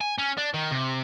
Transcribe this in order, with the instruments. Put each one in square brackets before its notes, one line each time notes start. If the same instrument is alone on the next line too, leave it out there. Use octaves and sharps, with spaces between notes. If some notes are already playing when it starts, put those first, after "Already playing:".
[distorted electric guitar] G#5
C#4
D4
D#3
C3